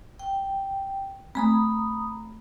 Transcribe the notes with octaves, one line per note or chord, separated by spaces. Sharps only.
G5
A3 C4 A#5 B5 D#6